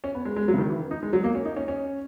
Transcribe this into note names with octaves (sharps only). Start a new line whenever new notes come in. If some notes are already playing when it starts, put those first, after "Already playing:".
C#4
B3
G#3
G#3
F#3
C#3
D#3
E3
D#4
G#3
F#3
A#3
C#4
D#4
C#4
C#4